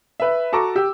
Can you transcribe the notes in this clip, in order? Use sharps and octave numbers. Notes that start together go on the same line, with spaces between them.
B4 E5
F#4 A4 A5 A#5 C#6 D6
G4 E6